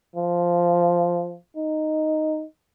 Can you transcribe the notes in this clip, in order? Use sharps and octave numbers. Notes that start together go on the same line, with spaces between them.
F3
D#4